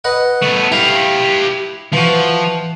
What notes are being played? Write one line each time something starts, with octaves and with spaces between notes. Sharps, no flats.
B4 D#5 F#5
A3 B3
E4 G4 F5
E3 F3 F#4